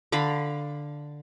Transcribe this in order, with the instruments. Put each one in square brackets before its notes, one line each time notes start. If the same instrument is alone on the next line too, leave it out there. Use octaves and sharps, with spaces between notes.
[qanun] D3 F5 B5